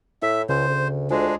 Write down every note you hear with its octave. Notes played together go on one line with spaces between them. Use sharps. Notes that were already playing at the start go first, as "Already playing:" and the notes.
A2 E4 E5 B6
C#2 C#3 C5
D2
D2 G#3 D4 F4 C5 G#5